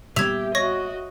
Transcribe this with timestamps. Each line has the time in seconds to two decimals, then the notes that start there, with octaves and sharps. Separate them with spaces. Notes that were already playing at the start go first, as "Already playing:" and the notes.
0.16 A#2 G3 B3 G4 E5 G#6 F7
0.55 F#4 C#5 D#5 C#6 A#6